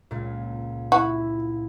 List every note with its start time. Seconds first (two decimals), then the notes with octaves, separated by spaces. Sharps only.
0.11 C#2 A#2
0.92 E4 F#4